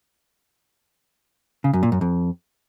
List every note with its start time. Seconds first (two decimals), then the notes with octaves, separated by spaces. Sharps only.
1.64 C#3
1.73 F#2
1.83 A#2
1.92 F#2
2.01 F2